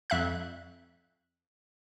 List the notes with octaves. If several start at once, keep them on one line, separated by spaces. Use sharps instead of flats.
F2 E5 F#6